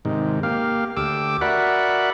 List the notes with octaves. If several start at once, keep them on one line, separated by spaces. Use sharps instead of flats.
G#2 C3 D#3
A#3 G4 F5
D2 G4 D6 E6
F#4 A#4 D5 E5 F#5 B5